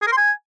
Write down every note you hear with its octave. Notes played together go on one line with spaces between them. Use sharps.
G#4
A#4
C6
G#5